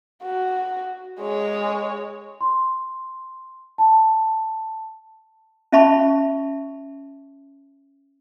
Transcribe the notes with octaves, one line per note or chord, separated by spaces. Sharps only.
F#4
G#3 C#5
C6
A5
C#4 F4 E5 A5 B5 C#6